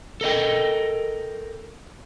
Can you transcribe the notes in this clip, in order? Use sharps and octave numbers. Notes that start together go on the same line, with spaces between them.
A4 A#4 D#5 G5